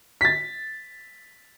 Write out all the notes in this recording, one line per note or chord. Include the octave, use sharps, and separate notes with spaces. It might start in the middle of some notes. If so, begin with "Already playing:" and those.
B6
A6